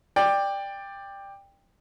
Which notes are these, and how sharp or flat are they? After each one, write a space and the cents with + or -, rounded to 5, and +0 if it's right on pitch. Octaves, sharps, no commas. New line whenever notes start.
D5 +10 G5 +15